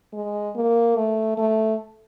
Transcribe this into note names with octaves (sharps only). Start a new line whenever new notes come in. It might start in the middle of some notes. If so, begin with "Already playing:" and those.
G#3
A#3
A3
A3